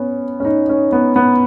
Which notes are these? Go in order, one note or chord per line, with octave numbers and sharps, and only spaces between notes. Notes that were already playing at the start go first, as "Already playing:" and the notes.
Already playing: B3 C#4
C#4
D#4
C#4
B3
B3